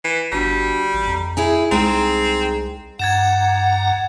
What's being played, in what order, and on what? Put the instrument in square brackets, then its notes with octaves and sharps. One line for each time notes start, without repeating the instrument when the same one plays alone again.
[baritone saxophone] E3
[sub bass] G1 [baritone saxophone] G3 [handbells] D4 F#4 A5
[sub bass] A1
[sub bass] F2 [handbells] A#5
[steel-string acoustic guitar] D#4 E4 G#4 [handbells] G#5
[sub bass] C2 [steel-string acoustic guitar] G#3 G#4 G5 [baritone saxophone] C4 [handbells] D#4 A#5
[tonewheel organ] G2 A#5 [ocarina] F#5 [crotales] G#6 A6 E7